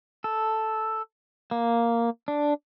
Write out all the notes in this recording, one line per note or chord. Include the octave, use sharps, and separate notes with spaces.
A4
A#3
D4